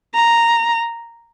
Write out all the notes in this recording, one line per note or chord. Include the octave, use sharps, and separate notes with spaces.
A#5